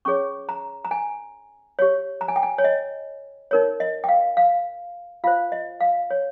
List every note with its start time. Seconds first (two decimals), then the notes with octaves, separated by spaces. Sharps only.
0.05 C#4 G#4 C#5 C#6
0.49 A#5
0.85 A#5
0.91 G#5
1.79 G4 C#5
2.21 A#5
2.28 G#5
2.36 G5
2.43 G#5
2.58 C#5
2.64 D#5
3.51 D#4 A#4 C#5
3.80 D#5
4.04 G5
4.09 F5
4.37 F5
5.24 F4 C5 F5
5.52 D#5
5.81 F5
6.11 C#5